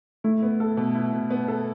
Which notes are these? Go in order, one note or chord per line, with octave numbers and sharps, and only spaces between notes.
A3 E4
B3
A4
B2
E4
B2
B3
A4